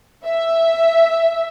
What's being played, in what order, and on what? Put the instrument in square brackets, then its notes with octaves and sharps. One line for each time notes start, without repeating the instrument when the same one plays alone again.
[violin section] E5